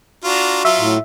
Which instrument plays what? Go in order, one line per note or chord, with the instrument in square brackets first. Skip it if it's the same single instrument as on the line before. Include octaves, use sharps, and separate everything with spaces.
[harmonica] D4 F4 A#5 [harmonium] F#4
[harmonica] F#3 F4 [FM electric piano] E5
[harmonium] A2